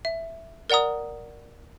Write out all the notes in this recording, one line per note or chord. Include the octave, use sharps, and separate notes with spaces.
E5
A#4 D5 F#5 A#5 D#6